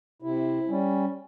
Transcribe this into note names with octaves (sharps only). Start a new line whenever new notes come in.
C3 E4
G3 C#4